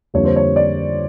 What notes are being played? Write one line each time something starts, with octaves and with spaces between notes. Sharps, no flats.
F2 D3 G3 A#3 C#5
C5
C#5
D5